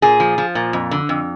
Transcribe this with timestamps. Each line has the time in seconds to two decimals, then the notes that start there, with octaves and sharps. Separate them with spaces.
0.02 A#2 G#4
0.20 F3
0.38 F3
0.55 A#2
0.73 F2
0.91 D3
1.09 F2